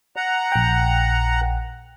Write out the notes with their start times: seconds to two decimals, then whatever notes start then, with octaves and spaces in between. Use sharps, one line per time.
0.16 F#5 A#5
0.52 A#1 G5